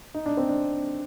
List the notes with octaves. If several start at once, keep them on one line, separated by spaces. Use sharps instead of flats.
D#4
D4
C4
D4